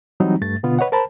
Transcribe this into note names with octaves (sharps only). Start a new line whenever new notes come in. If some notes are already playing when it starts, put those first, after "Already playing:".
E3 F#3 G3 C4 D#4
G2 A3 A6
B2 D3 B3 F4
B4 C#5 D#5 F#5
A#4 C5 A5 B5